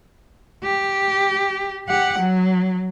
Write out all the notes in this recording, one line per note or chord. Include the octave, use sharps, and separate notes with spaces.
G4
G4 F#5
F#3